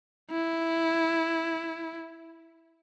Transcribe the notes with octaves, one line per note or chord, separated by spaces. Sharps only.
E4